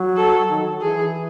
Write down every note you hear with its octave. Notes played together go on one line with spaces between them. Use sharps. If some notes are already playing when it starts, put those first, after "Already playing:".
Already playing: F#3
A4
D#3
E3 G#4